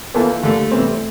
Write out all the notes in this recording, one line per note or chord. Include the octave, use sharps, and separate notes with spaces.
E2 E3 A#3 F4 A4
D3 G3 A3 A#3
C3 E3 G3 C4